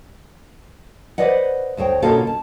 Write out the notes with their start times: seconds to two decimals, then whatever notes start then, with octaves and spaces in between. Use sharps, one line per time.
1.18 B4 C5 D5 D#5 F#5
1.77 D2 C5 C#5 G5
2.02 B2 D3 A#3 C#4 F4 A4
2.27 A5